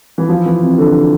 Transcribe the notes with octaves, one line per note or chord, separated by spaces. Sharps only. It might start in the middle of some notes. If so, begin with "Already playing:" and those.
E3
F3
E3
C3
D3